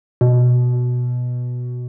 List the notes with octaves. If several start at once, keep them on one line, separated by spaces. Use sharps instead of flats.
B2